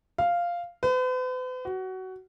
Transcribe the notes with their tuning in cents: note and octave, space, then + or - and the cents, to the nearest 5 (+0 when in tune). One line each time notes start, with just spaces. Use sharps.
F5 -5
B4 +45
F#4 +20